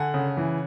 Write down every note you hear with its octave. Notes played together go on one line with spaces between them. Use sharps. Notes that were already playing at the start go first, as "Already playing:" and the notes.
Already playing: D3 F#5 G#5
C#3
E3